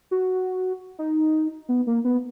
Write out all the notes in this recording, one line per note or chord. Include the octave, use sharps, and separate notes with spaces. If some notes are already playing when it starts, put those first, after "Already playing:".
F#4
D#4
B3
A#3
B3